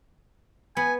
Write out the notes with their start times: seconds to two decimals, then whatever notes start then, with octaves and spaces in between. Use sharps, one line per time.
0.77 B3 G#5